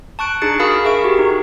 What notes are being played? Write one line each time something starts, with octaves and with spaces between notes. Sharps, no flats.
A5 C#6 F#6 D7
D4 D#4 G#4 A6 C#7
F#4 G#4 A#4 F5 B5 D#6
G#4 A#4 E5 C#6 D7
F#4 G4
D#4 F#4